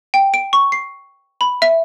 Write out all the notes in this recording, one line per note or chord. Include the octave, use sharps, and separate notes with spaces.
G5
D7
C#6
C7
B5
E5